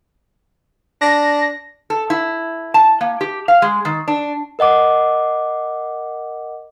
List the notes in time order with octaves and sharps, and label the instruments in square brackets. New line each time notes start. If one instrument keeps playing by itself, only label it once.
[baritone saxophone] D4 [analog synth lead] A#6
[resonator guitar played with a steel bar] A4
E4
A5
A#3
G4
F5
G#3
D#3
D4
[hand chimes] A#4 D#5 F#5 D6